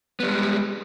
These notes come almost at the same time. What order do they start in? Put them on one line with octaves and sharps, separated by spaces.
B3 G3 G#3